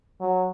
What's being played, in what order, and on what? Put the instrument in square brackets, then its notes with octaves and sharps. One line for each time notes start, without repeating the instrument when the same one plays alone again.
[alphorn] F#3